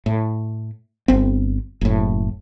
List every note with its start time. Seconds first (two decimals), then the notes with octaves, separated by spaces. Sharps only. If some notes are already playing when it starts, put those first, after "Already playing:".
0.06 A2
1.08 G1 C4
1.81 F#1 A2